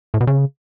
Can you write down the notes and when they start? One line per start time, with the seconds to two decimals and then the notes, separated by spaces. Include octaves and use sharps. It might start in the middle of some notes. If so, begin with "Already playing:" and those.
0.14 A2
0.21 B2
0.27 C#3